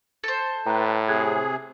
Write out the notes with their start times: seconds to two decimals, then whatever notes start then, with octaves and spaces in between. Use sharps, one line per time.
0.24 A4 C5
0.66 A2 B4 G5 A#5
1.09 C3 G#4 F#6 G#6